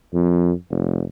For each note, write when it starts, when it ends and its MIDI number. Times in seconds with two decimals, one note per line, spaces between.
0.14 0.51 41
0.70 1.03 29